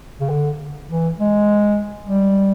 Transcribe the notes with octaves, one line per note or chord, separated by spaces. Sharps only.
C#3
D3
E3
G#3
G3